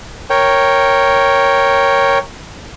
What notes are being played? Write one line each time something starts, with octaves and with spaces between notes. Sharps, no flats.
A#4 C#5 G5